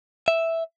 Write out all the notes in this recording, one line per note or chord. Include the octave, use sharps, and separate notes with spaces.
E5